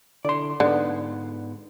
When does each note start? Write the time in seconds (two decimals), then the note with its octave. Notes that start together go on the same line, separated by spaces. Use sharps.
0.25 D3 E4 D5 C6
0.60 G#2 D3 B3